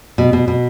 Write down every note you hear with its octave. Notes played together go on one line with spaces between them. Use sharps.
B2
B2
B2